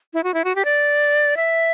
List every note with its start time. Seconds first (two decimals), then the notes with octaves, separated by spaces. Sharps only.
0.14 E4
0.24 F#4
0.34 E4
0.44 F#4
0.55 G4
0.65 D5
1.37 E5